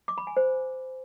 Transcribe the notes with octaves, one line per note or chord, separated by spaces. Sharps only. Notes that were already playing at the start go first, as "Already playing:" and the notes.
D6
B5
G#5
C5